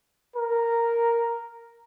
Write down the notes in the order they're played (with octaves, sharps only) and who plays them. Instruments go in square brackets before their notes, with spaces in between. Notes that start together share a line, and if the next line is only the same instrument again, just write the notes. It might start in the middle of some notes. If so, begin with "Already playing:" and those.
[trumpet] A#4